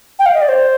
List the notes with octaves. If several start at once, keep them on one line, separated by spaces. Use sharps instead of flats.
G5
F5
D#5
D5
C5